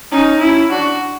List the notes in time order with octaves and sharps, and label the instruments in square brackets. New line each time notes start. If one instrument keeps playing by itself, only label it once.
[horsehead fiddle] C#4 [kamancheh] D#4
[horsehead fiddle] C#4 [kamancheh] E4
[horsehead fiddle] D4 [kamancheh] F#4